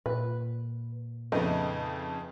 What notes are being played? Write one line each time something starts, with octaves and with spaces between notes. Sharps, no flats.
A#2 B4
F2 C#3 A3 B3 D#4 D#5